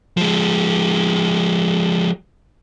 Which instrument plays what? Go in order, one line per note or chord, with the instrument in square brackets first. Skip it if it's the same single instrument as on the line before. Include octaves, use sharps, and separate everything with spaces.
[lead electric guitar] F3 G#3